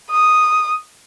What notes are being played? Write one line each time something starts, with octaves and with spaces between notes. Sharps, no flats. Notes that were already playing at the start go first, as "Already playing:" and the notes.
D#6